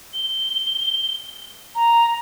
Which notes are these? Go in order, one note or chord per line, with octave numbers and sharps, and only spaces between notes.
G7
A#5